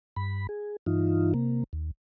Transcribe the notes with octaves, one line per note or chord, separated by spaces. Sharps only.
G2 B5
G#4
G2 E3 D#4 F4
C3 A#3
D#2